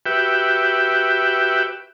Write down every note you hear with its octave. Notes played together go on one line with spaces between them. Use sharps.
F#4 G4 B4 E5 G5